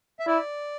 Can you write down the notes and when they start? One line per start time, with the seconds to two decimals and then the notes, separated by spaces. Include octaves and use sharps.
0.20 E5
0.26 E4 D5